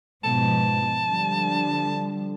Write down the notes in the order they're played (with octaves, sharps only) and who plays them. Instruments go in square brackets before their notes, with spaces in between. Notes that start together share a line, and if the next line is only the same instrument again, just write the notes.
[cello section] G#2 B2 F3 [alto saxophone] A5
[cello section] D3 F3 G3